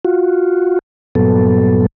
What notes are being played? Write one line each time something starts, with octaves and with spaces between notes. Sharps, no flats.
F4 F#4
G2 A#2 F#3 B3 A4